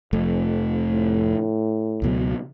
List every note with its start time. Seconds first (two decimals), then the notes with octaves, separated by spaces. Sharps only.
0.13 F1 F2 A3
0.91 A2
2.02 C#2 B2 F#3